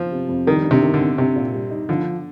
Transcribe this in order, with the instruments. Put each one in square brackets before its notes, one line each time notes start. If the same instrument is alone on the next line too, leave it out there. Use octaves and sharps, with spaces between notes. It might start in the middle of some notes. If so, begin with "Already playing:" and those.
Already playing: [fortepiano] F3
[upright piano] C3
F2
[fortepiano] D#3 [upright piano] G3
[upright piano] G2
[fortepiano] C3
[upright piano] D#3
[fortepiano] D3
[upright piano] C4
[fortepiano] C3 [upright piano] C4
[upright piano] A#2
G3
D#4
[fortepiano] D3 [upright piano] F3